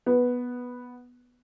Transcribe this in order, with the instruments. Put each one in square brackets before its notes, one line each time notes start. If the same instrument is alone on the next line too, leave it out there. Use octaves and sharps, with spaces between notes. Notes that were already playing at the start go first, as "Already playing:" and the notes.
[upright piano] B3